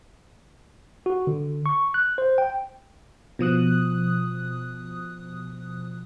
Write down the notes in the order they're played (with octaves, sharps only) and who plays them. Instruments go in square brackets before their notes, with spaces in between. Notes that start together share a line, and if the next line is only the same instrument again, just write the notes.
[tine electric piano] F#4
D3
C#6
F#6
C5
G5
[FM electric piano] B2 F3 D#6 F#6